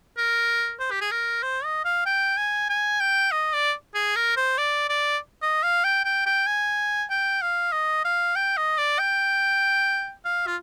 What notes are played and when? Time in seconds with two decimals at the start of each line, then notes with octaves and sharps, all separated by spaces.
0.17 A#4
0.80 C5
0.91 G4
1.01 G#4
1.11 A#4
1.43 C5
1.64 D#5
1.85 F5
2.06 G5
2.37 G#5
2.69 G#5
3.00 G5
3.32 D#5
3.53 D5
3.95 G#4
4.16 A#4
4.37 C5
4.58 D5
4.89 D5
5.42 D#5
5.63 F5
5.84 G5
6.05 G5
6.26 G5
6.47 G#5
7.10 G5
7.42 F5
7.72 D#5
8.05 F5
8.36 G5
8.57 D#5
8.78 D5
8.99 G5
10.25 F5
10.47 F4